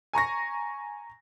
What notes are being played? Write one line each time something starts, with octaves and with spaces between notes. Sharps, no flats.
G#5 A#5 C#6 A#6